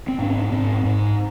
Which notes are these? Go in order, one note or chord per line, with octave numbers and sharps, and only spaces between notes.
C4
G#2 D4
C4
G#2 C4
G#2